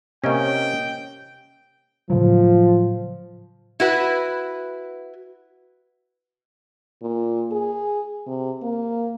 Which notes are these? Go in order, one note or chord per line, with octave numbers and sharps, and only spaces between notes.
C3 A#3 C#4 D#5 G5
A2 C#3 F3 F#3
E4 F#4 B4
A#2
G#4
C3
A#3